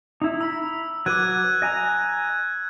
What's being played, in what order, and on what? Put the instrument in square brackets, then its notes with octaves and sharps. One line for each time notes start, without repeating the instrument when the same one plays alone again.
[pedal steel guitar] D#4 E4
[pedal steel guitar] A#5 B5 [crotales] E6
[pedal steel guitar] F#3 B4 D6 [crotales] F#6 G#6 D#7
[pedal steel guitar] D#5 G#5 A#5